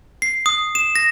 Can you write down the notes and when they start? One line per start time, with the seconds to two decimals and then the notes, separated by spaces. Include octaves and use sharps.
0.22 C7
0.46 D#6
0.75 E7
0.96 A#6